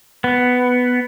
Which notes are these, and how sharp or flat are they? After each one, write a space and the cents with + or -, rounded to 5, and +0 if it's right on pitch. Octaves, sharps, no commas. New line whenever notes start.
B3 +5